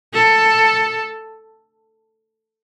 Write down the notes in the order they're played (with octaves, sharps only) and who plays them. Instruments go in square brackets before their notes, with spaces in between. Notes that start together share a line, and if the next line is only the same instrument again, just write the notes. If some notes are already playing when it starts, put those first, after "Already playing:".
[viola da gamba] A4